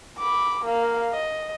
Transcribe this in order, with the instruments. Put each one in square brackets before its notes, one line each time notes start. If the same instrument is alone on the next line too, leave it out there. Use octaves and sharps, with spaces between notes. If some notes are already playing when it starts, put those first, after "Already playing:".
[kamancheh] B5 D6
A#3 F5
D#5